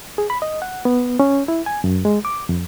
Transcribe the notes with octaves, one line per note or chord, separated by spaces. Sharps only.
G#4
B5
D#5
F#5
B3
C#4
E4
G#5
F#2
G#3
D6
F2